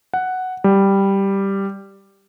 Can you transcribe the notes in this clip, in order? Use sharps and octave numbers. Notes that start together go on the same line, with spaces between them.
F#5
G3